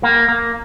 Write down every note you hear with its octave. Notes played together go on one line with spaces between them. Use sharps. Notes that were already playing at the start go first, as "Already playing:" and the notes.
A#3
A#3